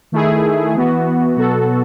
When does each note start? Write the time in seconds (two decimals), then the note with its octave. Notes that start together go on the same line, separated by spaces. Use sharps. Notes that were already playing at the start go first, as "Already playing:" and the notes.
0.12 D#3 A3 E4 G#4
0.74 E3 B3 F#4
1.37 B2 F#3 B3 F#4 A4